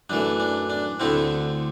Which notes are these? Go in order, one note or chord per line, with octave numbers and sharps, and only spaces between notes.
F#2 E3 A3 D4
D4
D4
D2 D3 A3 C4 E4